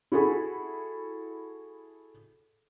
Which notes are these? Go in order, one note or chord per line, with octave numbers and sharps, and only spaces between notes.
E4 F#4 G#4 A4 B5